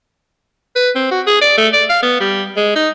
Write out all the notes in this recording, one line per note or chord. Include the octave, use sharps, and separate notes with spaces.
B4
C4
F#4
G#4
D5
A3
D5
F5
B3
G3
G#3
D#4